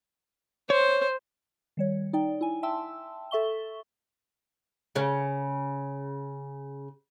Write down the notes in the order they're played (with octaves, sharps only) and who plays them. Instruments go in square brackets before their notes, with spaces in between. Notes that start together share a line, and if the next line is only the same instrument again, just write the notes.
[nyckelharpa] C5 [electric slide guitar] C#5
[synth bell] D#3 G3 C#5
D#4 D5 G5
E4 G#5
E5 G5 A5 C6 E6
A4 E5 C#6 G7
[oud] C#3 C#4